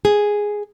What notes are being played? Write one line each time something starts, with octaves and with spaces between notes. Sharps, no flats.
G#4